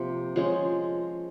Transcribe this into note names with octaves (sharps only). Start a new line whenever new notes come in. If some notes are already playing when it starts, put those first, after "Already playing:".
Already playing: C3 F3 A#3
F3 G#3 C#4